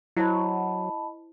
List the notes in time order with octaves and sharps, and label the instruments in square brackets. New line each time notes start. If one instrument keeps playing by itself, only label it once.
[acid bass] F#3 [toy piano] E4 C5 [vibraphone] D#5 A5 B5